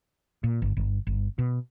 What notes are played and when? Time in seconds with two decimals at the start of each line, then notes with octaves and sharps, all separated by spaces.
0.44 A#2
0.62 G1
0.77 G1
1.07 G1
1.38 B2